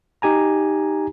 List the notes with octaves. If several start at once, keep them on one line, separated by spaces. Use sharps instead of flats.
D#4 G4 G#5 A#5